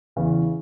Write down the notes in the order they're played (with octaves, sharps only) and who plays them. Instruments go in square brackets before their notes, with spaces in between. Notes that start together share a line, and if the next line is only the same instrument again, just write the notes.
[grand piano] E2 C#3 E3